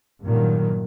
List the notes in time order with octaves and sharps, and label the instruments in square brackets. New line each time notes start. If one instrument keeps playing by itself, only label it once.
[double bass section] G2 A#2 D#3 F#3